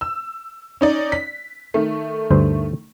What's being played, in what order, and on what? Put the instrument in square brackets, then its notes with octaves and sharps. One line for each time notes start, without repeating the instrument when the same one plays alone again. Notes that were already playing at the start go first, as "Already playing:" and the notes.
[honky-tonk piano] E6
C#4 D#4 D5
B6
D#3 A3
[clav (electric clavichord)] D2 G2 C5